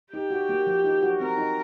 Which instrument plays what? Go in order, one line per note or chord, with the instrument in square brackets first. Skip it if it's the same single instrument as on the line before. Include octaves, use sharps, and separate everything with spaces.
[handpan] D#4 [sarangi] G4
[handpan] F#4
A#3
F3
D#4
F#4
[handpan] C4 [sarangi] A#4
[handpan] D#4